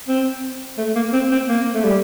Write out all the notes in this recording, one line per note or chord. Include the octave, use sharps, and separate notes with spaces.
C4
A3
A#3
C4
C4
A#3
A3
G3